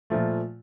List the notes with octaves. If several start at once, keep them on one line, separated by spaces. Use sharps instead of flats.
A#2 F3 A3